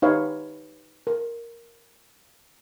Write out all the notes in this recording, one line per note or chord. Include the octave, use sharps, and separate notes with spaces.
D#4 G4 B4 C#5 F5
A#4